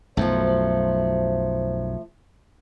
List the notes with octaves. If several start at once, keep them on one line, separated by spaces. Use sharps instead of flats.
B1 F#2 F3 A3 C5